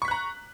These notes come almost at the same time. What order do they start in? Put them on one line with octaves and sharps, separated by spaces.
C#6 B6 F#6 A#5